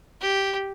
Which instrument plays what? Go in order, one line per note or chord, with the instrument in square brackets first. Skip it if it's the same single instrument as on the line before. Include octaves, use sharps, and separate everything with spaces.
[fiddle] G4